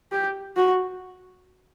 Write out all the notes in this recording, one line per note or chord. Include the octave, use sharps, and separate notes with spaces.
G4
F#4